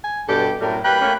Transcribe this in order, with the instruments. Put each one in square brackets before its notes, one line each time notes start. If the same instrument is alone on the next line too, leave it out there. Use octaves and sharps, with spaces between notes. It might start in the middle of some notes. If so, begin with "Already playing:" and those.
[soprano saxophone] G#5
[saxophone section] G2 G4 [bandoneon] B2 [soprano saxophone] A4
[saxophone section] F#2 G3 A#4 [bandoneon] A2 [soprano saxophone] A3
[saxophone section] G3 A#3 B4 [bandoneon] G5 F#6 [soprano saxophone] B5
[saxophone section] A3 A#3 C#4